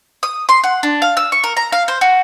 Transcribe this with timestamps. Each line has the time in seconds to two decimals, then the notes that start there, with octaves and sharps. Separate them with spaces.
0.23 D#6
0.49 C6
0.64 F#5
0.83 D4
1.02 F5
1.17 E6
1.32 C#6
1.44 A#4
1.57 A#5
1.72 F5
1.88 C5
2.01 F#4